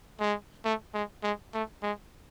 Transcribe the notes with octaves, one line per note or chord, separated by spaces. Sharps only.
G#3
A3
G#3
G#3
A3
G#3